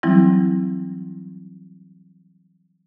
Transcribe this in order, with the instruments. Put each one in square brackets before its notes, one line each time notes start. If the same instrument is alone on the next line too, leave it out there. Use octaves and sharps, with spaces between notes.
[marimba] E3 F#3 G3 C4 E4